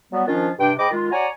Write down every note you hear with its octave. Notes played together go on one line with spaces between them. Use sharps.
F#3 G3 B3
D#3 F3 C#4 D4 F4
G2 C3 D4 G5
G#2 D#5 G5 B5 D6
D#3 G#3 F4
F#4 C#5 D5 G#5 A#5